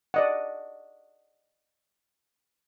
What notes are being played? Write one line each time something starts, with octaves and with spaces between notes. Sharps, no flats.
D5 D#5 F#5